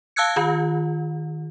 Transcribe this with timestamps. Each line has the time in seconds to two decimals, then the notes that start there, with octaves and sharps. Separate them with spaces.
0.16 F5 A5 E6 F#6 G#6 C#7
0.36 D#3 F4